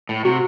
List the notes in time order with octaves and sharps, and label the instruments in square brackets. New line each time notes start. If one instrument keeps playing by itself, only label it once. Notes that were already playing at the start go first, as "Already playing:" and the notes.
[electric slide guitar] A2
[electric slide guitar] C3 [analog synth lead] F#4